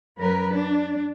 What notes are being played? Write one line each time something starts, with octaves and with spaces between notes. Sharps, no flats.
F#2 A#4 B4
D4